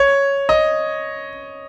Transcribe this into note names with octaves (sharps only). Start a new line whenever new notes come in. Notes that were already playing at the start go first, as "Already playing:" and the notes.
Already playing: C#5
D#5